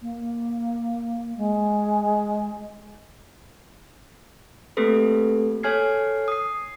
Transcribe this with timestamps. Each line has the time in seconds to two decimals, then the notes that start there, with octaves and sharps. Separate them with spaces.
0.01 A#3
1.37 G#3
4.77 A3 A#3 C4 G4 A4 B4
5.63 A4 C#5 G#5 F6 G#6 C7
6.28 D#6 C7